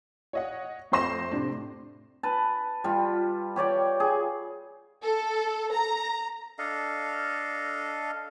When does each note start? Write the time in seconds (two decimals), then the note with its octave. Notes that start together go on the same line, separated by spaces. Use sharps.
0.33 C#5 D#5 F#5
0.92 F2 A3 C5 C6 A#6 E7
1.31 A2 C3 D4
2.23 B4 A5
2.84 G3 F4
3.56 G4 C#5 D5 G5
4.00 G#4
5.04 A4
5.74 A#5
6.58 D4 A4 D#5 F5